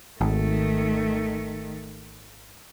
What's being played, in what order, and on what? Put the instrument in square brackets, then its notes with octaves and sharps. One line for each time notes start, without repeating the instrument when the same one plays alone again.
[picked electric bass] G#1 [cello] D#3 A3